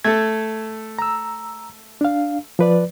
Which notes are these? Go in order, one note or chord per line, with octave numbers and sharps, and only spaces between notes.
A3 A4 G#6
A#5 E6
D4 F5
F3 B4 D5